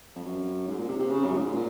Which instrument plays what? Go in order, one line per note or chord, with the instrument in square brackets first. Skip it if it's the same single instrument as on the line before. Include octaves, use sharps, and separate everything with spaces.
[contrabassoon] F2
F#2
G#2
A#2
C3
C3
C#3
F#2
A#2
G#2
A#2